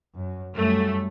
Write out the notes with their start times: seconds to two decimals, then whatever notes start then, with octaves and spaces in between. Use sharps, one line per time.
0.15 F#2
0.55 F#2 G3 A3